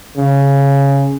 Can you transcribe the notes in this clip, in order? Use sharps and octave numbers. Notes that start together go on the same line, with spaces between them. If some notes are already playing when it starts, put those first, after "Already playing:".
C#3